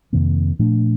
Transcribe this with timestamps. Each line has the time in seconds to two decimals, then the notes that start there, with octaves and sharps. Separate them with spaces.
0.13 F2 C3 D#3 A#3
0.59 A#2 F3 A3 D4